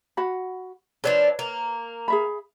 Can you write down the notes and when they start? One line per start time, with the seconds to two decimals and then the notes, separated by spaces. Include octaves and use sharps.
0.17 F#4 F#5 B5
1.04 F3 D4 A4 B4 C#5
1.39 A#3
2.08 G#4 E5 B5